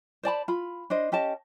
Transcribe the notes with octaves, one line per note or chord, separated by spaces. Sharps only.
C5 D5 A5 B5
F4 B5
D4 C5 D#5
C#4 G4 D#5 A5